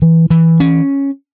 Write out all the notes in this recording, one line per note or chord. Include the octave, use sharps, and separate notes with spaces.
E3
E3
C#4